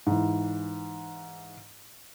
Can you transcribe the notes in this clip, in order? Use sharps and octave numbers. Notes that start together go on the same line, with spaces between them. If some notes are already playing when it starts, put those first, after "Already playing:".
G#2 E3